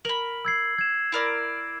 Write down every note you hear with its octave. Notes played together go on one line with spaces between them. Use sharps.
A#4 B5 F#7
E6 G#6 C7
G#6 E7
E4 A#4 D5